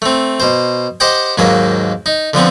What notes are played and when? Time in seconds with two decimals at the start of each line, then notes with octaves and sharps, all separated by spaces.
0.02 A3 C4
0.40 B2 C5
1.00 G4 C5 D#5 F#5 G5
1.38 D#2 G#2 F#3 A#3 B4
2.06 D#4
2.34 D3 F3 B3 C4